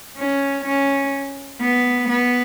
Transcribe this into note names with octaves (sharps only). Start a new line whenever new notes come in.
C#4
C#4
B3
B3